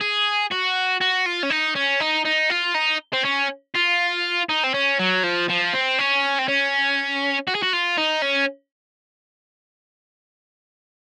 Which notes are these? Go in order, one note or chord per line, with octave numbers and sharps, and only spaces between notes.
G#4
F#4
F#4
F4
C#4
D#4
C#4
D#4
D#4
F4
D#4
C4
C#4
F4
D#4
C4
C#4
F#3
F3
F3
C4
C#4
C4
C#4
F#4
G#4
F#4
F4
D#4
C#4